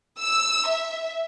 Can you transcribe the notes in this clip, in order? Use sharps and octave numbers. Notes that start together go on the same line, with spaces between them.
E6
E5